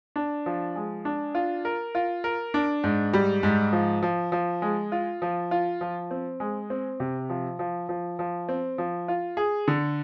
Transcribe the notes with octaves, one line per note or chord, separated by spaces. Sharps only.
D4
F3
G#3
D4
F4
A#4
F4
A#4
D4
G#2
G3
G#2
F3
F3
F3
G#3
F4
F3
F4
F3
C4
G#3
C4
C3
F3
F3
F3
F3
C4
F3
F4
G#4
D3